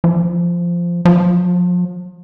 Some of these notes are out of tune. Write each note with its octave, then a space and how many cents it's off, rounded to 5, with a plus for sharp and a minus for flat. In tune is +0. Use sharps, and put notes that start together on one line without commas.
F3 -10
F3 +35